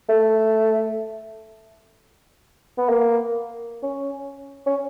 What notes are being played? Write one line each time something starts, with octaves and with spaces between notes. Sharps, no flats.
A3
B3
A#3
C#4
C#4